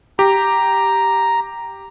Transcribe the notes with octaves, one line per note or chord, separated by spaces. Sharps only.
G4 A#5